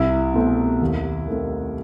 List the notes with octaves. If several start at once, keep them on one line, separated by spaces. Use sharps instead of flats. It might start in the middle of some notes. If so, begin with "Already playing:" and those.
Already playing: C2 E4
B2 A3 C4
D#2
D#3 A3 C4